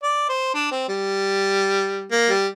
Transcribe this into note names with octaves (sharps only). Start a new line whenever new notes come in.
D5
C5
D4
C4
G3
A#3
G3